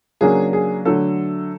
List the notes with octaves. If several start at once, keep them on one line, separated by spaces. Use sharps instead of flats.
C#3 F#3 A#3 D4 G#4
G#4
D3 F#3 A3 A4